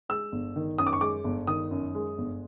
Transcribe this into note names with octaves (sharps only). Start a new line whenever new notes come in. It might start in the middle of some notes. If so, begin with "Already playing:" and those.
G#3 E6
G1
D#3
F#2 D#6
D6
C#6
G#3 D6
G1
D#3 D#6
F#2
G#3
G1